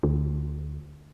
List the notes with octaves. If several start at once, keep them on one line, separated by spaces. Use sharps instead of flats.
D2